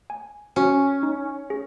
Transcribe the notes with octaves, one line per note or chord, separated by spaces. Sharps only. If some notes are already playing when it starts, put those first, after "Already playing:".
G#5
C#4 F#4
D#4
G#4